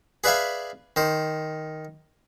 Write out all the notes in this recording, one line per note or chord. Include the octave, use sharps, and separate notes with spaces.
G#4 B4 D5 E5 F5 G#5
D#3 C5